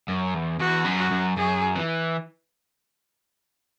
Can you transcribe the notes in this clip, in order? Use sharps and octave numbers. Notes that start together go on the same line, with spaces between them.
F#2
E2
E2 F#4
F#2
F#4
F#2
F#2 G#4
E3